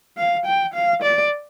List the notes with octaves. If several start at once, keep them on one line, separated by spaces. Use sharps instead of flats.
F5
G5
F5
D5